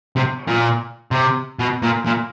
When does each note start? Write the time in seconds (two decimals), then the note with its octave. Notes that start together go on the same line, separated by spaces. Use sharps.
0.17 C3
0.48 A#2
1.11 C3
1.59 B2
1.82 A#2
2.06 A#2